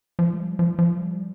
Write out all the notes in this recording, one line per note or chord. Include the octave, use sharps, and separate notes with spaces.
F3
G#3
G3
F3
F3
G3